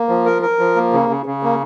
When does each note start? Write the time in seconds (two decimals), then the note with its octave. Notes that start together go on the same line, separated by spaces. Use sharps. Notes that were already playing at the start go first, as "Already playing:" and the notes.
Already playing: A#3
0.09 F3
0.26 A#4
0.42 A#4
0.59 F3
0.76 A#3
0.93 C#3
1.09 C#3
1.26 C#3
1.43 A#3